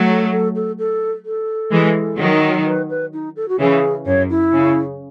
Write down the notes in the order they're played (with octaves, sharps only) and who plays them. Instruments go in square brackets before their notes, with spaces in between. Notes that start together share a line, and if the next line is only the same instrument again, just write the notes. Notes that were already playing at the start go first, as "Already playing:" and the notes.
Already playing: [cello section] F#3 A3
[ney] A4
A4
A4
A4
A4
[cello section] E3 G#3
D#3 F#3
[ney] B4
B4
D#4
A4
F#4
[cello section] C#3 E3 [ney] G#4
[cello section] F#2 [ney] C#5
[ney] E4
[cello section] C#3